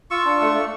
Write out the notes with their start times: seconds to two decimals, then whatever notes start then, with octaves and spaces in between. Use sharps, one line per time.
0.10 F4 C#6 E6
0.25 D4
0.41 A3
0.55 A3